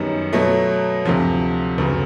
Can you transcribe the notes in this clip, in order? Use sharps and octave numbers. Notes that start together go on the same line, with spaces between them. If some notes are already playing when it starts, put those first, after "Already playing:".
Already playing: F#2 D#3 G3 B3
B2 F#3 A3
D2 C3 F3
D2 C#3 F#3 B3